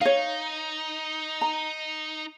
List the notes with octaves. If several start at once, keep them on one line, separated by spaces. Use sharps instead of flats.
D#4 C#5 F5
A#5